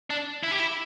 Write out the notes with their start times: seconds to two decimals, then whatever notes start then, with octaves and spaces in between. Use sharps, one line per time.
0.10 D4
0.43 E4
0.51 G4
0.59 E4